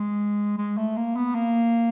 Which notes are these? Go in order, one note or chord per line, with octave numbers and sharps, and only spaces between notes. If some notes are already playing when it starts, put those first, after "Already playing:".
Already playing: G#3
G#3
A3
A#3
B3
A#3